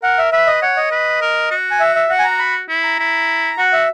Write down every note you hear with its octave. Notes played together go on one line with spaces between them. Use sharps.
A#4 F#5
E5
B4 E5
D#5
C#5 F#5
D#5
B4
A#4
F#4
G#5
E5
E5
F#4 F#5
G#5
A#5
B5
E4
A#5
E4
F#4 F#5
E5